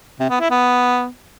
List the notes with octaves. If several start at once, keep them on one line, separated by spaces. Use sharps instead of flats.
C3
B3
E4
B3